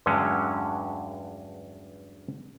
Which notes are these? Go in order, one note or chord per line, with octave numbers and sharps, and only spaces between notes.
E2 G2 D3 F#3 G#3 C#4